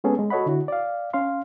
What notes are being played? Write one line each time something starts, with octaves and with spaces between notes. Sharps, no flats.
G#3 B3 C#4 G#4 A4
G#3
F#4 A4 C#5 D#5 F#5 B5
D3 E4 F#4
D5 F5
C#4 F5 C6